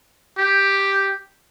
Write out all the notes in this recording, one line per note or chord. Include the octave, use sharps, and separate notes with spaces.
G4